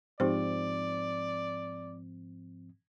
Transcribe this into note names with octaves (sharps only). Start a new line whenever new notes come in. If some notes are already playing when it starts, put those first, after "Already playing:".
G#2 F3 C4 D#4 G4 C5 D5